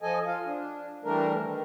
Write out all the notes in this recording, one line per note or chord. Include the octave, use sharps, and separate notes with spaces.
F3 A4 D#5 G#5
F4 F5
D4
E3 G3 A3 D4 A#4
D#3